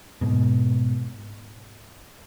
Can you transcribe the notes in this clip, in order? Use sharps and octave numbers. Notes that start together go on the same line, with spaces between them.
G#2 B2